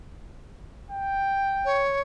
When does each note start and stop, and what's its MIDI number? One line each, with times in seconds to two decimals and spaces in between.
0.90 1.81 79
1.65 2.01 73